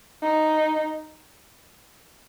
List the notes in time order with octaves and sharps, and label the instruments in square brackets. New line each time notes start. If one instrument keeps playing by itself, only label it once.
[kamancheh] D#4